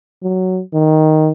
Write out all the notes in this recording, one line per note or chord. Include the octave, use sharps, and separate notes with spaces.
F#3
D#3